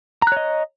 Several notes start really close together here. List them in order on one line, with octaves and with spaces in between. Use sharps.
A#5 F#6 C#5 D#5